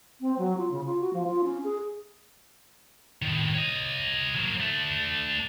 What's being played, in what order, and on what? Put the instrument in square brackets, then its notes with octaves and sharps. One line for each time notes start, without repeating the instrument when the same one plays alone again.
[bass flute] C4
F#3
F4
C#3
F4
F#4
F3
F4
C#4
G#4
[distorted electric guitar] A2 D#3
C#5 D#5
F#3 A#3
A3 D4